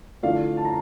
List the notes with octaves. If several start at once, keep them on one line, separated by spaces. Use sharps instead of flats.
D3 F3 A3 E4 D5 F5
A5
A#5